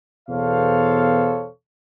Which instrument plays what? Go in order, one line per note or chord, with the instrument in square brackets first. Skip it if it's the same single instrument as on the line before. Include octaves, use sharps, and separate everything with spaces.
[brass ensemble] E2 B2 A4 C5 C#5 F5